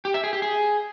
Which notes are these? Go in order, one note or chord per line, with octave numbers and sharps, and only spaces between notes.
G4
E5
G#4
G4
G#4